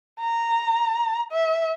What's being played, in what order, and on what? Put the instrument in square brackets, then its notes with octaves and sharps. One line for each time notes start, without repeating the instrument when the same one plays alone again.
[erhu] A#5
E5